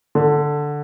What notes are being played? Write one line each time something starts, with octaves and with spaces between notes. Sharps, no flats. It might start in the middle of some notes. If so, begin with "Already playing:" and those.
D3